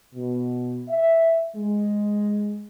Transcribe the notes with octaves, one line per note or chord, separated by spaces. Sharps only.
B2
E5
G#3